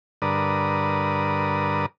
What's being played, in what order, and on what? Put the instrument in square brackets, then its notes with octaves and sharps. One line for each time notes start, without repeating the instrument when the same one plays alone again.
[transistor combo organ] G2 D3 A#4 B4 D5 D#6